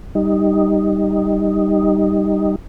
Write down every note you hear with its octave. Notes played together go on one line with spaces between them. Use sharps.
G3 D#4